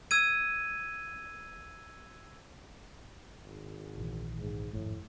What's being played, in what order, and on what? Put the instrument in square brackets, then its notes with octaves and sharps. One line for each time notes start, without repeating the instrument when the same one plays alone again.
[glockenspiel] E6 G#6 D#7
[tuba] G#1
[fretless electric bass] A#1 D#3 E3
[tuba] G#2
[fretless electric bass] G#1 F2 [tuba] A2